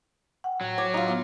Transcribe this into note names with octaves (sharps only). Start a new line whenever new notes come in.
F#5 G5
A2 F#3
C#5 D6
D#4 F4
B3 F4